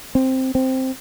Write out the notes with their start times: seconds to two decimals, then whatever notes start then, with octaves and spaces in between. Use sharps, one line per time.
0.15 C4
0.55 C4